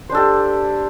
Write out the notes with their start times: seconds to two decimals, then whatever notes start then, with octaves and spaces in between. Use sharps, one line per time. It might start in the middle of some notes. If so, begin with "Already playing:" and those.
0.10 C5
0.12 D4
0.15 A4
0.17 G4